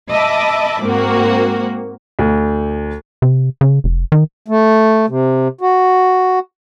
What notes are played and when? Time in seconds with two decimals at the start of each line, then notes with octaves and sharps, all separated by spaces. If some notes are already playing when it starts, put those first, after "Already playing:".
0.11 D#5 E5 A5 B5 D6
0.82 G#2 A#3 C4 F#4
2.19 D2
3.22 C3
3.61 C#3
3.84 F1
4.12 D#3
4.48 A3
5.09 C3
5.61 F#4